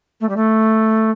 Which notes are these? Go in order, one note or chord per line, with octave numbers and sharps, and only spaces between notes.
A3
G3
A3